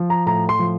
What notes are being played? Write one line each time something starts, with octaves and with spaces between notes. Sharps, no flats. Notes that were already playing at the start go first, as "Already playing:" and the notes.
Already playing: F3
A#5
A2 A#5
C6
F3